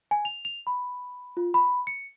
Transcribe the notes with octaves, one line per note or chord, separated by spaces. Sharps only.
G#5
F7
F7
B5
F4
B5
C#7